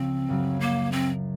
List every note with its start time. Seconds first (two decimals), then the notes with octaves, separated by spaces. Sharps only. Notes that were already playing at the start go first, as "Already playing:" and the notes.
Already playing: C#2 C#3 F3 C4
0.28 F#2 C#3 F#3
0.60 A#3
0.92 C4